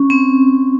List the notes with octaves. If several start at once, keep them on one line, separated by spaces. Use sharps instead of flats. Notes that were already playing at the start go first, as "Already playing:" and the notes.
Already playing: C#4
C4